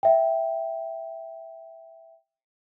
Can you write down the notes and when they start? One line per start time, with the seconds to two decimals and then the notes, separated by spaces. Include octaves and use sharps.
0.03 E5 G5